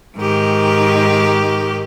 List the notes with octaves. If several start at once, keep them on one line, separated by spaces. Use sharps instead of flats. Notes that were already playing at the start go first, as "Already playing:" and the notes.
G#2 D#3 G4